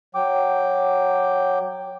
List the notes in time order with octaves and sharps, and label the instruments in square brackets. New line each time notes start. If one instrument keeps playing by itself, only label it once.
[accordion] F#3 G5 D6